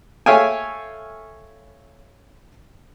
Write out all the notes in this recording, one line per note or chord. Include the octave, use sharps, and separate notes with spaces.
A4 C#5 E5 F5 G5 G#5